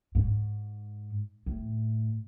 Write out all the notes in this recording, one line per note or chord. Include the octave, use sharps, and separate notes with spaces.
G#2
A2